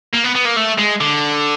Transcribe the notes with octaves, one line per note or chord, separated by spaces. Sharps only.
A#3
B3
B3
A#3
A3
G#3
D3